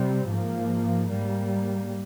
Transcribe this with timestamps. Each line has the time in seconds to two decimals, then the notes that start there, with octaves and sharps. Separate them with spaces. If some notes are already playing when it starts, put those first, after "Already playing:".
Already playing: C3 G3 C4
0.28 G#2 F3 A#3
1.09 G#2 G3 A#3